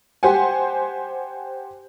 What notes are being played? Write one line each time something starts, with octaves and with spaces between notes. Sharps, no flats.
G4 C5 F#5 G#5